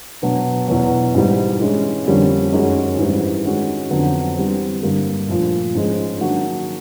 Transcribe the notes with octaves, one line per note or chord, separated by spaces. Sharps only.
B2 F#3 B3 D4
E2 B2 F#3
G#2 E3 G3
E3 G#3 C#4
F2 D3 G3 A#3 C#4
F#2 D#3 G#3 C#4 F#4
G#2 E3 G3
D#3 G#3 C#4 F#4
F2 D3 F#3 B3
E3 G3 C4
G2 D3 G3 A#3
A#2 F3 A3
G#2 F3 G#3 C#4
D#3 F#3 A#3 D4 F#4